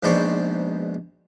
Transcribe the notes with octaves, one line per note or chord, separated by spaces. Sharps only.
A#1 G#2 B2 C5 D5 C#6